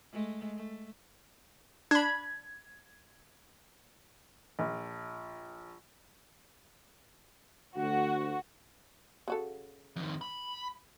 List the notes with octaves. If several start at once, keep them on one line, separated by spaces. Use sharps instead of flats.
G#3 A3
A3
D4 B5 G#6
A#1
D2 F#4
C#3 F#4 A4
F2 D#3
B5